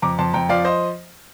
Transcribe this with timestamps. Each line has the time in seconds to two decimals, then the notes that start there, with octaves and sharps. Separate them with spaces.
0.02 F2 A#5 D6
0.18 F2 A5 C6
0.33 F2 G5 A#5
0.49 F3 D5 F5
0.64 C5 D#5